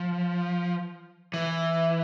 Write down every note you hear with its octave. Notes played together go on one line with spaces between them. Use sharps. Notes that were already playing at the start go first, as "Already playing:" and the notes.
Already playing: F3
E3